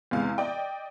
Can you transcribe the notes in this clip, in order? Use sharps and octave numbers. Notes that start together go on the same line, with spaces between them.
E2 C3 G#3 F5
D5 D#5 G5